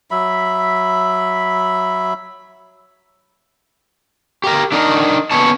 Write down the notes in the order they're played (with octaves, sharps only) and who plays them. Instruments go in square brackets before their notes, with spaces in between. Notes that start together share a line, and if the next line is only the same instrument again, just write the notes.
[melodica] F#3 E5 B5
[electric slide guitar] G4 A#4
D4 D#4 A#4
B3 C#4 C#5 A5